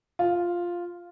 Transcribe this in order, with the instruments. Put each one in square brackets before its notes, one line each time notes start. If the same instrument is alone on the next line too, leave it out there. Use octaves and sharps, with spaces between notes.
[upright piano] F4